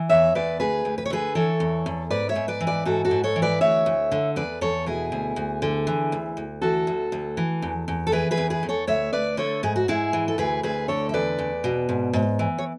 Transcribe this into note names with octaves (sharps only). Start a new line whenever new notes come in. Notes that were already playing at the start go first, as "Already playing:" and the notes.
Already playing: E3
E2 C#5 E5
E2 B4 D5
D2 G#4 B4
D2
B4
C#5
D3 G#4 B4
E3 A4 C#5
E2
E2
G#2 B4 D5
C#5 E5
G#2
B4 D5
E3
B4 D5
G#2 F#4 A4
F#4 A4
G#2
A4 C#5
E3
B4 D5
D2 C#5 E5
D2
D3
E2 B4 D5
E2 A4 C#5
B2 E4 G#4
D2
D2
D3
E3
D2
D2
E3 F#4 A4
D2
D2
E3
E2
E2
A4
E3 G#4 B4
G#4 B4
E2
G#4 B4
E2
A4 C#5
D2 C#5 E5
D2 B4 D5
D3 A4 C#5
G#2 G#4
F#4
G#2 E4 G#4
E3
A4
D2 G#4 B4
D2 G#4 B4
D3 A4 C#5
E5
E2 B4 D5
E2
B2
G#2
G#2
E3
C#5